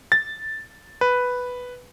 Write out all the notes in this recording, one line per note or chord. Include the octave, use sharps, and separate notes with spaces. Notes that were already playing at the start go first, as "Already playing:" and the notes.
A6
B4